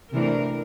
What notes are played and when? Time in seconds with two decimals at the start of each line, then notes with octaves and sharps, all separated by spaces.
0.12 C3 E3 A3 D4 A#4